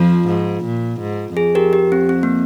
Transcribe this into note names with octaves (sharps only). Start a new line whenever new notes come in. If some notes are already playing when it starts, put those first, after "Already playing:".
Already playing: F2 F3 F4
G#2
A#2
G#2
F2 G#4
G4 A#4
G4
C4
C4
A#3